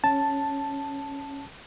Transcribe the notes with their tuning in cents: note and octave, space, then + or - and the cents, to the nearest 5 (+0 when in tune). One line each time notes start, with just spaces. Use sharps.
C#4 +0 A5 +0